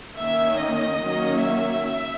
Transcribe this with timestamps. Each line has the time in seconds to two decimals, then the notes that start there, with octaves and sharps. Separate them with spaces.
0.18 D#3 A#3 C#4 E5
0.60 D#5
1.03 D#3 F#3 A#3 C#4
1.45 E5